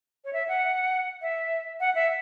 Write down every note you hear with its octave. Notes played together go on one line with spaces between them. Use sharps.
C#5
E5
F#5
E5
F#5
E5